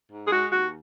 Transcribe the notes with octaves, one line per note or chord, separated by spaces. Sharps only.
G#2
G#4
G#3 F#4
D#2 F#4